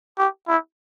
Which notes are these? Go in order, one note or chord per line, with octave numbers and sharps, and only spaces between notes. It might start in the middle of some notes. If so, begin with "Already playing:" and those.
G4
E4